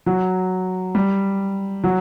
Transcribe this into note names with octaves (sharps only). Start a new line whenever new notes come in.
F#3
G3
F#3